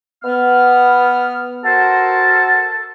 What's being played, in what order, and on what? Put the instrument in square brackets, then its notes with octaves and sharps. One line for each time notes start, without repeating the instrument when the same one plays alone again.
[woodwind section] B3 F6
[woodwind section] F#4 A#4 C5 [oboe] A4